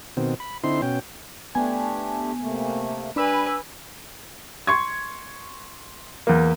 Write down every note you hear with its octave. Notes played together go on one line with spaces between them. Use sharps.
B2 D#3 C4
B5
D3 C4 D#4 E4 C6
B2 C#4 G5
A3 B3 D4 G4 G#5
C3 A3 A#3
G3 D4 B4 G#5 B5 E6
C6 C#6 G#6
E2 A#3